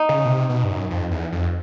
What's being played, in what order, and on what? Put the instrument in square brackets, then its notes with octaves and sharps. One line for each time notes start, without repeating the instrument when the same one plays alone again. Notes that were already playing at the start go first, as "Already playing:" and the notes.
Already playing: [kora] D#4
[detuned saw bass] C#3
B2
C3
B2
G2
F#2
F2
E2
F2